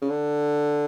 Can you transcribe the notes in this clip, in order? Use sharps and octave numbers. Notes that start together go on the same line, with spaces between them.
C#3
D3